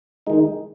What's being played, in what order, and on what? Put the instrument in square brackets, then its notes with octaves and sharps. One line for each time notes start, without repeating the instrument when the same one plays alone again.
[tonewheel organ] D#3 G#3 D#4